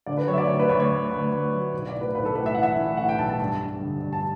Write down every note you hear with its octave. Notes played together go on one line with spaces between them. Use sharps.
D3 D5
B4
F#3 C#5
E5
D5
D2 C#5
B4
D2 C#5
C#5
D2
D2
D2
F#3
B1
D5
A2
B4
B1 B4
A4
A2 B4
E5
E3 F#5
E5
E3
A2 F#5
G5
B1 A5
A5
G2 A5
G2
D3
G2
A5